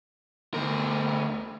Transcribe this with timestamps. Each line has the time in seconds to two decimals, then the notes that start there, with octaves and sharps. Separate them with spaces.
0.54 D2 A#4